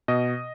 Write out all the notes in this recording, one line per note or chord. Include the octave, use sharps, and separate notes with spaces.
B2 D#5